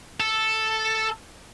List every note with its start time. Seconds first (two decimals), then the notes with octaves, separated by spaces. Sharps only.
0.20 A4